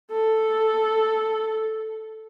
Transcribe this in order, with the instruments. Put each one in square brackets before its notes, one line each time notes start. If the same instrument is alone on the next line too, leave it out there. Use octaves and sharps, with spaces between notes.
[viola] A4